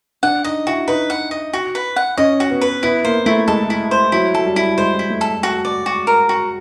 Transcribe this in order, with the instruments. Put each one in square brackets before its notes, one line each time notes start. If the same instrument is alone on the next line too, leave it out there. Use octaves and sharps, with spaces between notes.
[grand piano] D4 [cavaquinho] F#5
[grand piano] D#4 [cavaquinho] D#5
[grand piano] E4 [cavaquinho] F#4
[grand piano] D#4 [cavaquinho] B4
[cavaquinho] F#5
D#5
F#4
B4
F#5
[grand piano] C#4 [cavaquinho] D#5
[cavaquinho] F#4
[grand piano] B3
[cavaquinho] B4
[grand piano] B3 [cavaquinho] E4
[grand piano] A#3 [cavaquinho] C5
[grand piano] A3 [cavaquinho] E4
[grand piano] G#3 [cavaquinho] A4
[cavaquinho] E4
C5
[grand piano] F#3 [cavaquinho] E4
[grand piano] F#3 [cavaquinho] A4
[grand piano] G3
[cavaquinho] E4
[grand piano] G#3 [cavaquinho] C5
[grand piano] G#3
[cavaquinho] E4
[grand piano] A3
[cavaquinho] A4
F#4
D5
F#4
A#4
F#4